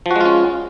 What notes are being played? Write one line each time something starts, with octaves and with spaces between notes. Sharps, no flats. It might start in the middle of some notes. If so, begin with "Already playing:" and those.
F3 G#3 C#4 F4 F#4